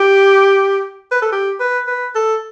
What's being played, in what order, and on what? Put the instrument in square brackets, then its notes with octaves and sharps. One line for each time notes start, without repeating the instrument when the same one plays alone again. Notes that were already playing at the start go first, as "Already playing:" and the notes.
Already playing: [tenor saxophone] G4
B4
A4
G4
B4
B4
A4